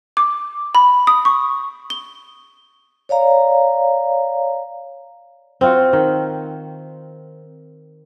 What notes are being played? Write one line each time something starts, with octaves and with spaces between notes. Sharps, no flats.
D6
B5
D#6
C#6
G7
C#5 D5 F5 A#5
C4 F4 F#4
D#3